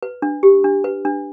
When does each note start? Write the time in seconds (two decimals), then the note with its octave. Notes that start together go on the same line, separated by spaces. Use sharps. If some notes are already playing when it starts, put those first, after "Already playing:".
0.03 B4
0.22 D4
0.43 G4
0.64 D4
0.84 B4
1.05 D4